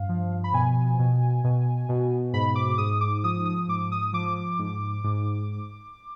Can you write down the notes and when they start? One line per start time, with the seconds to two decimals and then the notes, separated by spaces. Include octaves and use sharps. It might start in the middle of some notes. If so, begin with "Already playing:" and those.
Already playing: G2 F5
0.09 F3
0.44 B5
0.53 B2 G#5
0.99 B2
1.44 B2
1.89 B2
2.33 G#2 B5
2.55 D6
2.78 G#2 D#6
3.01 D6
3.24 F3 D#6
3.46 D#6
3.68 G#2 D6
3.92 D#6
4.13 F3 D6
4.59 G#2
5.04 G#2